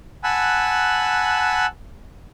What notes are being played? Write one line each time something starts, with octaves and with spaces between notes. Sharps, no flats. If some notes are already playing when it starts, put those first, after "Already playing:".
F#5 G#5 A5 B5 E6 F#6